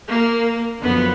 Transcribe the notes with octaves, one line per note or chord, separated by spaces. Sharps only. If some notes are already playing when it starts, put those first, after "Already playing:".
A#3
F#2 D3 F3 B3